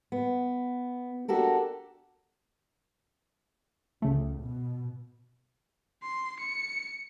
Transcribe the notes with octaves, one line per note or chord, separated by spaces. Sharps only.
B3
D4 F#4 G4 A4 A#4
C#2 C#3 A3
B2
C6
C#7